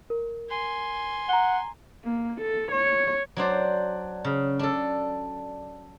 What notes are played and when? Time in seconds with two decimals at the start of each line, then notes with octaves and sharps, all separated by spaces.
0.10 A#4
0.50 G#5 C6
1.29 F#5 A#5 G7
2.04 A#3
2.41 A4
2.72 C#5
3.37 F#3 D4 C5 D5
4.24 C#3
4.59 D4 A4